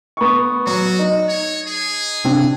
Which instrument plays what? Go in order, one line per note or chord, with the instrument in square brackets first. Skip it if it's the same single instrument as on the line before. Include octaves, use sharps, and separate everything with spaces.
[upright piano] B3 C#6
[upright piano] F#3 [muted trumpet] F#4
[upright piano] D#4
[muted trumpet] C#5
G#4
[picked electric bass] C3 C4 D4